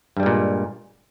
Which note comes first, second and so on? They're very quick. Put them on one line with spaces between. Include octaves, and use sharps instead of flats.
G2 G3 G#3 A#2